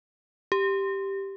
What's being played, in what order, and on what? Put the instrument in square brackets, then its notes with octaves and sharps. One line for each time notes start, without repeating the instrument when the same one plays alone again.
[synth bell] G4